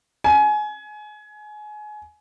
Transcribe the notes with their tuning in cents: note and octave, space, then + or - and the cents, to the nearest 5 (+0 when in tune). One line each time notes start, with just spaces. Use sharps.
G#5 +25